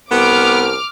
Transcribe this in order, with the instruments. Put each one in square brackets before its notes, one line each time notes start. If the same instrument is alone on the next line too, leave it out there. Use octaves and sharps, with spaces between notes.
[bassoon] C2 [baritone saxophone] B3 [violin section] D6 F6